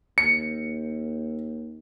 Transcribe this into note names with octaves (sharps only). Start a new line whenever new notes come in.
D#2 C#7